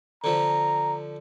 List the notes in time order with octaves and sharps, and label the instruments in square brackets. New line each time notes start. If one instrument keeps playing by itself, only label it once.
[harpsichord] D3 F3 [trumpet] A#5